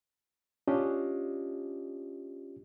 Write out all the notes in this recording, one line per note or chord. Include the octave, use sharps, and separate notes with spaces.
C#4 D4 F4 G4 D#5